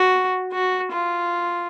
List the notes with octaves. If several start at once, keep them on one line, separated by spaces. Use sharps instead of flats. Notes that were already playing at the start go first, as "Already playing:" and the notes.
Already playing: F#4
F#4
F4